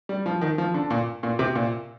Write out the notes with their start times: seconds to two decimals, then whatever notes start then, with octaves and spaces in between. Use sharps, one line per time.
0.09 G3
0.26 F3
0.41 D#3
0.58 F3
0.74 D3
0.90 A#2
1.23 A#2
1.39 C3
1.55 A#2